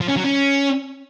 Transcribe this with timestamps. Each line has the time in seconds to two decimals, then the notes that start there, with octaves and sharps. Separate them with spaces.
0.01 F3
0.09 C#4
0.16 F#3
0.24 C#4